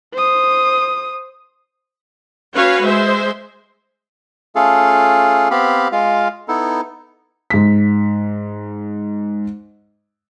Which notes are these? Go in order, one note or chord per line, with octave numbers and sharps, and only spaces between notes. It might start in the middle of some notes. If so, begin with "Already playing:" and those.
C5 D#6
C#4 F#4 B4 C#5 F5
G#3 C5 E5
A3 C#4 F4 G#4 A4 F5
B3 C4 G4 F5 B5
G#3 F4 F5
B3 D#4 E4 A4
G#2 B6